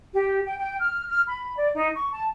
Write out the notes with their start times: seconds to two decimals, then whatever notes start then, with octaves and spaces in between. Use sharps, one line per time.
0.13 G4
0.45 G5
0.57 G5
0.80 F6
1.10 F6
1.27 B5
1.56 D5
1.74 D#4
1.95 C#6
2.12 A5